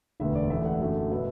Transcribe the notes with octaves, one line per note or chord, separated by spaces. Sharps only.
E1 D2 D3 B3 E5
D5
A1 A2 A3 E5
F#5
F#2 D3 A3
B2 B3 E5